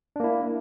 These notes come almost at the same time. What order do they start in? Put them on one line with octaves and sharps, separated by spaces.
D4 A#3 E4